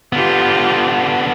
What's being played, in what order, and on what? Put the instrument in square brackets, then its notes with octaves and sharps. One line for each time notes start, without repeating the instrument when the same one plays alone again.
[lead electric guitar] D3 B3 [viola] F4 G4